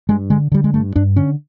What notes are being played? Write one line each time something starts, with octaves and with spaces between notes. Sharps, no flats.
G2 G#3
D3 G#3
D3 G3
G#3
G2 A3
G2 D4
D3 C#4